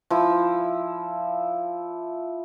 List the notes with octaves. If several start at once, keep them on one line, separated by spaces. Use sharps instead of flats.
F3 E4